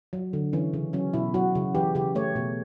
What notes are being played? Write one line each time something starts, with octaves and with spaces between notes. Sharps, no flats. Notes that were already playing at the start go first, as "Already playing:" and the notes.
F#3
D3
E3 C#4
C#3
F#3 C#4
B2 E4
F#3 F#4
C#3
E3 G4
C#3 G4
A3 C#5
B2